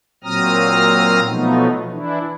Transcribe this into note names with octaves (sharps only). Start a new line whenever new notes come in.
A#2 F#3 C4 A#5 D#6 F6
B2 F3 F#3 A3 B3 D#4
E3 D4 E4